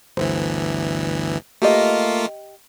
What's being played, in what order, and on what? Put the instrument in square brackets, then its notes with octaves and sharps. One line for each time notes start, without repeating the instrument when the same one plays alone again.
[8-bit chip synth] G1 D2 E3 [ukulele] C5
[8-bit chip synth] A3 A#3 F4 [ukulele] G4 D#5